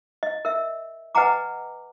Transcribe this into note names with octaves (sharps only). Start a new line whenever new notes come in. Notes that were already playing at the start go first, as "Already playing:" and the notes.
D#5
A#4 E5
B4 D#5 F#5 G#5 A#5 D6